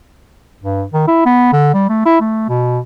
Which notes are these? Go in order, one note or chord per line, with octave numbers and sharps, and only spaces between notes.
G2
D#3
E4
B3
D3
G3
A3
E4
A3
B2